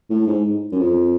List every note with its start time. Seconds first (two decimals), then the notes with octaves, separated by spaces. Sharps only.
0.10 A2
0.27 G#2
0.72 F#2
0.79 F2